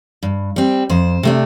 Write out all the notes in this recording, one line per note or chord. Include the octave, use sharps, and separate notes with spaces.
G2
G3 C4
F2 C5
C3 A3 D4